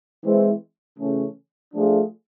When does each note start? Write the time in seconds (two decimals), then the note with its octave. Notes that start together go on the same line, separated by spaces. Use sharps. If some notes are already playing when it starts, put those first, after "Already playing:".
0.23 E3 G#3 C4 E4
0.98 C#3 E3 A3 C#4
1.73 F3 A3 D4 F4 G#4